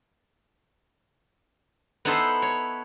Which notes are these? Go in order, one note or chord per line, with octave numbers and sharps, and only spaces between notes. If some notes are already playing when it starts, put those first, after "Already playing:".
B3 D#4 E4 A4 C5
C#5